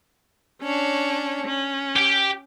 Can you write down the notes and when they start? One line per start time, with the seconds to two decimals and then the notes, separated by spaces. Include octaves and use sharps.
0.61 C#4 D4 C#5
1.46 C#4
1.96 G4 G5